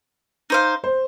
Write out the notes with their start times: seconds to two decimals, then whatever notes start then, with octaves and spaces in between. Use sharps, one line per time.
0.50 D#4 C5 F5
0.84 C5